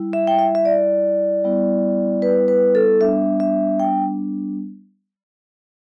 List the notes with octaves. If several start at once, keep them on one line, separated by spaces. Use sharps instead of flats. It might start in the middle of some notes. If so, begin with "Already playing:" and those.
Already playing: G3 E4
E5
G5
E5
E5
D5
G3 B3 E4
B4
B4
A4
G3 B3 D4 E5
E5
G5